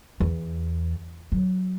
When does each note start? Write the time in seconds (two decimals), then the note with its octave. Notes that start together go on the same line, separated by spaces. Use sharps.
0.20 E2
1.32 F#3